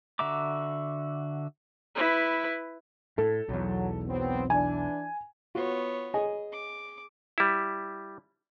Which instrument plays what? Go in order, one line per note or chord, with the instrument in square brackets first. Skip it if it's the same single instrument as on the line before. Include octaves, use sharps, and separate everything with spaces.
[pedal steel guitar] D3 F#4 E5 A#5 D6
[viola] E4 B4
[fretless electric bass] A2 [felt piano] A4
[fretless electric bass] B1 E2 [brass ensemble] F#3
[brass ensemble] F#3 B3 C4
[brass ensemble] E3 D4 [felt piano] G#5
[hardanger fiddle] B3 C#5 [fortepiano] F4 F#4
[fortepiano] G#4 D#5 G#5
[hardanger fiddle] D6
[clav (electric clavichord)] G3 E4